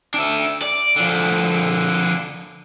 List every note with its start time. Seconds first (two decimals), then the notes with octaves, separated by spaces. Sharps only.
0.14 D4 E5
0.62 D5
0.96 D3 F3